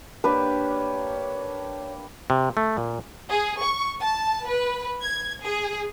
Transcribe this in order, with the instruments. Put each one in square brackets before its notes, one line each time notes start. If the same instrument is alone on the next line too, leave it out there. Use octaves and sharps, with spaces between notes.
[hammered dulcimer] A#3 D4 G4 [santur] B4 [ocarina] C#5
[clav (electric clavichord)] C3
A3
A#2
[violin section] G#4
C#6
A5
B4
G#6
G#4